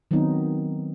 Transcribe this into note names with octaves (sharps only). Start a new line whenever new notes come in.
D#3 F#3 B3 C4 D#4